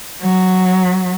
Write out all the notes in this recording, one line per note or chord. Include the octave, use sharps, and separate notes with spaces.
F#3